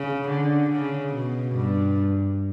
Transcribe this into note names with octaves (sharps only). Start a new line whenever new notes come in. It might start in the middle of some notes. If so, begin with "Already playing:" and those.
Already playing: C#3
D3
C#3
B2
G2